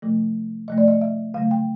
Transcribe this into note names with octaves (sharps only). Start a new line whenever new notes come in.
C3 F3 A3
C3 F3 A3 D#5
D5
D#5
E5
C#3 F#3 A3 F5
G5